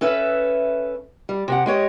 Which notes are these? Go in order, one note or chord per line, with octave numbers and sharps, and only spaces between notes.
C#4 A4 B4 E5
G3
C3 G4 F#5
G#3 G4 C#5 D#5